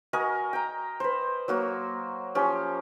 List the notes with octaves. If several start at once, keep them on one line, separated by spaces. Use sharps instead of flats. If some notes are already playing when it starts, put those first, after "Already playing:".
F#4 A#4 D#5 G#5
G5 A#5
B4 C5
F#3 A#3 F#4
F3 C#4 G4